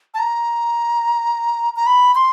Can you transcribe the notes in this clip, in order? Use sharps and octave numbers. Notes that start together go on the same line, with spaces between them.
A5
A#5
A#5
B5
C6